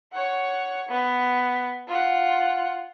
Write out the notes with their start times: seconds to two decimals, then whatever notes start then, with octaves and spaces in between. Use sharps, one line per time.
0.12 C#5 F#5
0.89 B3
1.87 F4 F#5